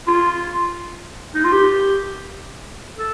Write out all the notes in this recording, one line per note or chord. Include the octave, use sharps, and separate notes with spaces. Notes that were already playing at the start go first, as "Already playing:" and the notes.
F4
D#4
F4
G4
A4